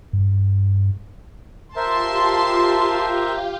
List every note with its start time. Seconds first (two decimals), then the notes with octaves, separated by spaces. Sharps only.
0.13 G2
1.76 F4 G4 A#4 C5 E5 A5 C6